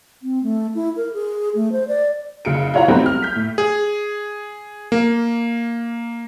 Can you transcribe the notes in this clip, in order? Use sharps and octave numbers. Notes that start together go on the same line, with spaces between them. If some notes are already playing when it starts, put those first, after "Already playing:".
C4
A3
E4
A#4
G#4
A3
C5
D5
F#1 C#3 C#7 D7
E4 F4 C#5 F#5 A#5
F#3 G3 A3 B3 C4 D#4
F6
G6 B6
A2
G#4
A#3